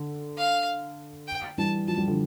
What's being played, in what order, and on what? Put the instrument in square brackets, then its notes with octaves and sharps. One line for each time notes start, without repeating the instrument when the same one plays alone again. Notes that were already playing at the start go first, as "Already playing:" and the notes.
Already playing: [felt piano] D3
[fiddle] F5
G5
[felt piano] E3 G3 [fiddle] A5
[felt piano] F3 [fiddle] A5
[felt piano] G3
D3 F3